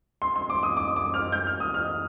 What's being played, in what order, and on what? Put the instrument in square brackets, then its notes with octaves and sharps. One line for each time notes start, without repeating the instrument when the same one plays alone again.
[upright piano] C6
C6
D6
D#6
D6
D6
F6
G6
F6
D#6
F6